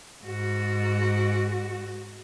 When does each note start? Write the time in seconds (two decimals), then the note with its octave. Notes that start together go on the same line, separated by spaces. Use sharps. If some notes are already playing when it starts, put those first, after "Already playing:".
0.24 G#2 F#4